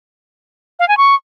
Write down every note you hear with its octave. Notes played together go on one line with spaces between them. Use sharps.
F5
G#5
C#6